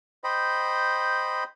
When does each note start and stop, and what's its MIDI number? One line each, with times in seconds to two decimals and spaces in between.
0.24 1.44 72
0.24 1.44 75
0.24 1.44 79
0.24 1.44 83